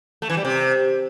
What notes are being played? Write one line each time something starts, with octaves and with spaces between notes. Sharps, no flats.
A3
E3
G3
C3